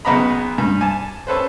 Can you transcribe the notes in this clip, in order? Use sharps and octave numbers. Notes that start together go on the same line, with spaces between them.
B1 C#3 B3 D#5 A#5 B5
G2
G#5 A5
C#4 A4 B4 C5